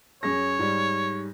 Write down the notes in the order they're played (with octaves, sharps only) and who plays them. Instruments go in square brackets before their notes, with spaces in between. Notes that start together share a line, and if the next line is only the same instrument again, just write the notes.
[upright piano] F#2 G#4 A#6 [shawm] C#5
[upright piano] G#2 G3